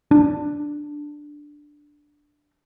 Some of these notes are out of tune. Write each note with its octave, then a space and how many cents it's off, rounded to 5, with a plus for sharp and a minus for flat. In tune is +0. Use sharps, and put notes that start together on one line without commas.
D4 +5